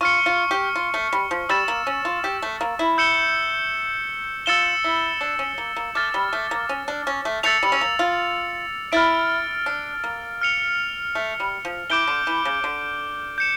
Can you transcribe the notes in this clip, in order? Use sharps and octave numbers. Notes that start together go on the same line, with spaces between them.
F4 C#6 F6 C#7
F4
G4
F4
A3
G3
F3
G3 E6 A6 E7
A#3
C#4
F4
G4
A3
A#3
E4
E6 G6 C#7 E7 G7
F4 E6 A6 C#7 E7 G7
E4
D4
C#4
A#3
A#3
A3 D6 F6 A6
G3
A3
A#3
C#4
D4
C#4
A3
A3 E6 A6 C#7 F7
G3
C#4
A#3
F4
E4 F6 A6 D7
D4
A#3
F6 C#7 F7
A3
G3
F3
E3 D6 G6 D7 G7
D3
E3
C#3
D3
G6 C#7 E7